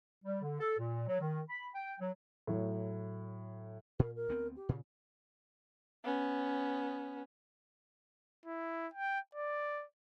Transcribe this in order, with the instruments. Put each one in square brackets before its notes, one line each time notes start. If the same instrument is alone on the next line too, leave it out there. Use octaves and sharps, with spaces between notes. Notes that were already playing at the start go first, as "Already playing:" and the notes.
[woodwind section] G3
D3
A4
A#2
F#3
D#3
B5
G5
F#3
[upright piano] A2 F#3
[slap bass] A#2 [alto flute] A#4
[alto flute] A#4
[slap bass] D2 B3 C4
[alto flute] G4
[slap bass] A#2 C#3
[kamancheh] B3 C#4
[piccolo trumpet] E4
G5
D5